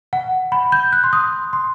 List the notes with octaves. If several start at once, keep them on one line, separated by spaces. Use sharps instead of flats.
F#5
B5
G6
F#6
C6
D#6
C6